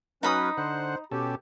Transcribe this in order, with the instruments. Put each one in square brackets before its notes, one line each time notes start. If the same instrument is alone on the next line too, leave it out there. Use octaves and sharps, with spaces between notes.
[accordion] F#3 C#4 B4 [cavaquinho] D#4 B5 D#6
[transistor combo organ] D3 F#5 [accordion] C5
[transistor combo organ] B2 C#4 A4 [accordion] G4